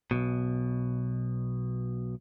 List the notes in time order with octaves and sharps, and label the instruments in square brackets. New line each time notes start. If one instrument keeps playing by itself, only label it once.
[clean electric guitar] B1 F#2 B2